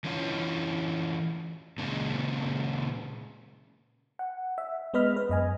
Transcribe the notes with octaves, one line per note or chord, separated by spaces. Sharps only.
E3 C#4 F4
A#2 C#3 G#3
F#5
E5
G#3 B3 B4 D#5 B5 F6
B4
F#2 D#5 G#5